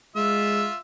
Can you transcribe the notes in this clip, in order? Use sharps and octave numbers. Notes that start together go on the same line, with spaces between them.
G#3 F4 E5 E6